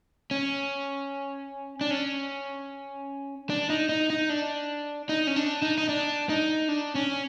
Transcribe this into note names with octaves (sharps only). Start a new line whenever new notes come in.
C#4
D4
C#4
D4
D#4
D#4
D#4
D4
D#4
C#4
D4
D#4
D#4
D4
D#4
D4
C#4